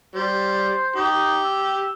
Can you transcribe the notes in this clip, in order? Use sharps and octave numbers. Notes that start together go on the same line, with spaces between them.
G3 C5
D#4 G4
E6